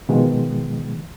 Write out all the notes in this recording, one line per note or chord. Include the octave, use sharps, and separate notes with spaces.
B2 D#3 F3 G#3